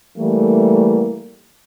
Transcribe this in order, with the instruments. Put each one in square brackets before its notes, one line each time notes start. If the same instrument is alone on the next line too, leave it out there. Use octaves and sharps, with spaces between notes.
[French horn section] E3 G3 A3 A#3